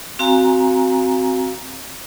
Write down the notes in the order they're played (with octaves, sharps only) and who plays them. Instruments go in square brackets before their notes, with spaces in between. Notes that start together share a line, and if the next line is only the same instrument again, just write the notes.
[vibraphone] C4 F#4 F5 G#5 A#5